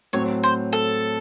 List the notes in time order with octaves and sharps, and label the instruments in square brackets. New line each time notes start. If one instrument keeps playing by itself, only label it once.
[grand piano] A2 F#3 C4 [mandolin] C#5
[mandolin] C5
A4